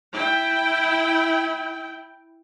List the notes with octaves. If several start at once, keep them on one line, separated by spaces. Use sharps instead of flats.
E4 G5